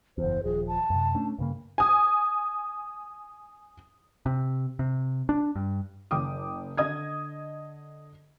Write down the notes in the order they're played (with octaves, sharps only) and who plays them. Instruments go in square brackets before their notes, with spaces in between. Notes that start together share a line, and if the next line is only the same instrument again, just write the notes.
[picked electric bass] F#1 E2 [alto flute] C5
[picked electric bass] D#1 F3 [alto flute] G#4
[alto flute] A5
[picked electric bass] F#2 C3
A3 C#4 D4
G2 C#3 A#3
[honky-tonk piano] G#5 D#6
[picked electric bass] C3
C3
D4
G2
[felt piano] F#1 G5 D6 D#6
D3 D#5 D#6 G#6